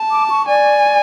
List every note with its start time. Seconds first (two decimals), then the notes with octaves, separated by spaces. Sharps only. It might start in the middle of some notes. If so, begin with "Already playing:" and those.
Already playing: A5
0.11 D6
0.30 C#6
0.48 D5 G#5